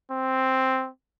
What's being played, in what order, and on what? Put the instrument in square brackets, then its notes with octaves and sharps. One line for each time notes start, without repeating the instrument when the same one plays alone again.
[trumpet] C4